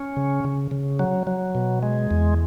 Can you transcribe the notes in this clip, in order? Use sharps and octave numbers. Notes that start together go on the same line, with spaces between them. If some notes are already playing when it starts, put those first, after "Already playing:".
Already playing: C#4
C#3
C#3
C#3
F#3
F#3
B2
G#3
E2